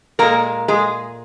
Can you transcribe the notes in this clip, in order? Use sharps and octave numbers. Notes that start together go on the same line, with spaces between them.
A#2 G#3 A#3 A#4
G#3 G#4